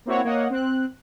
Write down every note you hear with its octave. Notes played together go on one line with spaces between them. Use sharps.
A#3 C4 E4 F#4 C#5 F#5
A#3 C#5 D#5 F#5
C4 F#6